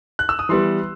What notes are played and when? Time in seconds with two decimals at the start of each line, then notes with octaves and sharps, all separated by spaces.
0.19 F#6
0.29 E6
0.39 D#6
0.49 E3 G3 B3 C6